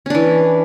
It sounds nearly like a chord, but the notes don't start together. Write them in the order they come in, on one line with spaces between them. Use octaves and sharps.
C#4 D4 E3